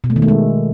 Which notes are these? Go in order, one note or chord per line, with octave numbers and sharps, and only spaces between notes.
B2
A3
D#3
A3
G#3